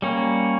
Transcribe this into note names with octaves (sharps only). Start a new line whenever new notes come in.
G3 A#3 C#4